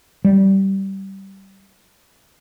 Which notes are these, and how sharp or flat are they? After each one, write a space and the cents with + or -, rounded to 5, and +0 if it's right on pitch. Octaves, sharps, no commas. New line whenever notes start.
G3 -15